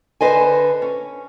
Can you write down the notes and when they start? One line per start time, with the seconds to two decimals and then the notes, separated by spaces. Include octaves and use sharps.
0.21 D3 G#4 B4 C5 D#5 G#5
0.82 C#4